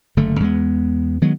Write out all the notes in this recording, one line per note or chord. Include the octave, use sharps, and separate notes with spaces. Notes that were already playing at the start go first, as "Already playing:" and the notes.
F#1 D3 A3
E2 G#3 B3
D#3 F#3 G#3 B3